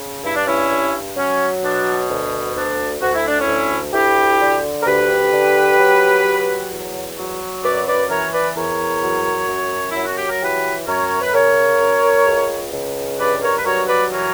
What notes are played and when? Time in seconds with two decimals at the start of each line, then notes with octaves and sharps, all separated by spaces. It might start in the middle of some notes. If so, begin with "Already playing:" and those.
Already playing: C#3
0.24 G2 E4
0.35 D4
0.47 C#4 E4
0.70 G2
1.16 F#3 C#4
1.63 B2 D4
2.09 D2
2.55 D2 D4
3.01 D2 F#4
3.14 E4
3.27 D4
3.40 C#4 E4
3.48 D2
3.93 D2 E4 G4
4.41 D3
4.82 A#4
4.86 D2 G4 B4
5.32 D3
5.79 F#3
6.25 F#3
6.71 E2
7.17 F#3
7.63 F#2 B4 D5
7.87 B4 D5
8.10 E3 A#4 C#5
8.33 B4 D5
8.56 E2 A#4 C#5
9.02 F#3
9.48 F#2
9.91 F#3 E4
10.04 F#4
10.17 G4
10.29 A#4
10.41 E3 G4 B4
10.87 F#2 A#4 C#5
11.22 B4
11.33 C#3 A#4 C#5
11.80 F#2
12.26 C#2
12.73 C#2
13.19 G2 B4 D5
13.42 A#4 C#5
13.57 B4
13.65 F#3 A#4 C#5
13.88 B4 D5
14.11 E3 A#4 C#5